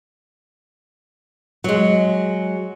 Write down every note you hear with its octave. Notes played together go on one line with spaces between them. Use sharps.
F#3 G#3